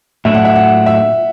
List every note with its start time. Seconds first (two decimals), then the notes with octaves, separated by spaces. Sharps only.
0.25 A2 F#3 A3 D4 E5
0.34 F#5
0.45 E5
0.56 F#5
0.86 E5